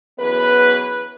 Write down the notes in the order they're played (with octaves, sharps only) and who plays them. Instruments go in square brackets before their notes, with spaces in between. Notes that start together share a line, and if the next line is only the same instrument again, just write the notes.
[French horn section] F#2 E3 B3 G#4 B4